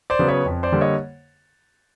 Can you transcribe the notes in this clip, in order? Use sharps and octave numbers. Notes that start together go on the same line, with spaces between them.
C5 D5
C#3 F#3 B3
B4 C#5
F2
C5 D5
D3 G3 A#3
C#5 D#5